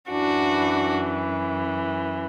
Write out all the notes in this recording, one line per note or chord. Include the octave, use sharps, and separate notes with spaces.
F#2 E3 D4 F#4